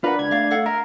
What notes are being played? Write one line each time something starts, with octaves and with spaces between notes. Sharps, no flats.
D4 F4 A#4 B4 F#5
C#2 G#6
A3 D5 F5
A4 F5 F#5
A#4 E5